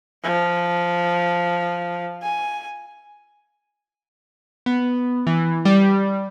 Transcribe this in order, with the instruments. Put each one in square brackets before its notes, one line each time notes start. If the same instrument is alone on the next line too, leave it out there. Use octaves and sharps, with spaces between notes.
[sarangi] F3
G#5
[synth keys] B3
E3
G3